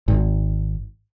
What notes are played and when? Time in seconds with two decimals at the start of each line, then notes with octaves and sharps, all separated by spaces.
0.08 G#1